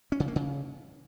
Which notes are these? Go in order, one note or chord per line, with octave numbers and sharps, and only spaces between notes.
C#4
C#3
A#3
C#3